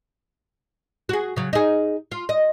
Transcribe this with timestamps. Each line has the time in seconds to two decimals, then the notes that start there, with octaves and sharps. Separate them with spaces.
1.09 F#4 G#4
1.36 C#3 F#3
1.53 D#4 G#4
2.11 F4
2.29 D#5